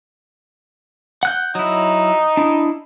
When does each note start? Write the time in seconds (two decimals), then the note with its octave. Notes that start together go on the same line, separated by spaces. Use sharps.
1.23 F#5 F#6 G6
1.55 F#3 D#4 E4
2.37 D4 E4